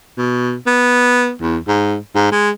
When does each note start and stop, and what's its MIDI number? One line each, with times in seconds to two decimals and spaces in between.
0.17 0.55 47
0.67 1.32 59
1.41 1.58 40
1.68 1.96 44
2.15 2.30 44
2.31 2.50 56